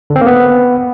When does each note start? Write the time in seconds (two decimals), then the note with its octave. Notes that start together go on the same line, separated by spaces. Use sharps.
0.10 D3
0.16 C4
0.21 A#3
0.27 B3